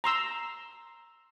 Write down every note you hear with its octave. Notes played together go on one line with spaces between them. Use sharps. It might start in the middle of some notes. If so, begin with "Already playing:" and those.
A#5 C6 E6